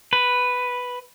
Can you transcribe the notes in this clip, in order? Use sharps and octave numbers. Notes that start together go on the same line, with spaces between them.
B4